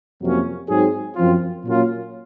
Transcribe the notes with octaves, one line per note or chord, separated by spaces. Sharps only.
F2 C3 F#3 A#3 C#4
G#2 F#3 C4 D#4 G#4
F#2 F3 C4 F4
A#2 F#3 A#3 C#4 F4